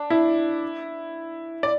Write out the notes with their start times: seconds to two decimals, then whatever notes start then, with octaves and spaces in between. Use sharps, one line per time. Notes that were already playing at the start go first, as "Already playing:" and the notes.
Already playing: D4
0.10 E4
1.63 D5